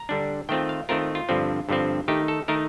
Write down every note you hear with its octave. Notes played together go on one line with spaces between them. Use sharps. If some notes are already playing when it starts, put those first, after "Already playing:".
Already playing: A#5
D3 G3 D4
D#3 A3 C4 F4 G5
F5
D#3 A3 C4 F4 A#4
F4
G2 D3 F3 C4
G2 D3 F3 C4
D#3 A3 D#4 G4
A4
D#3 A3 D#4 A#4